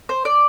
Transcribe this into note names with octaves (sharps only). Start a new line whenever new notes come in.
C5
D5